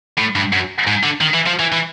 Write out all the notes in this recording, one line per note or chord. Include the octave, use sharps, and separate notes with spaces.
A2
G2
F#2
G#2
D3
D#3
E3
F3
E3
E3